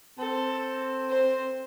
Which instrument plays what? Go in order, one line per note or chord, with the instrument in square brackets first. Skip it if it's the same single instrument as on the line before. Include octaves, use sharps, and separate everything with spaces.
[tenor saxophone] C4 [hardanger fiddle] A4
[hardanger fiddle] C5